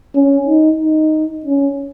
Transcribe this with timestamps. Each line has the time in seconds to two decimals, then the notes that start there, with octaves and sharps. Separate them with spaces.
0.15 C#4
0.47 D#4
0.79 D#4
1.45 C#4